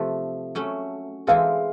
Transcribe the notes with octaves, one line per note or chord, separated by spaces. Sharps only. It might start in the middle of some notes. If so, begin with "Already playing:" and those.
Already playing: C3 F3 A3
F#3 A3 C#4
E3 G#3 C4 E4 A4 F5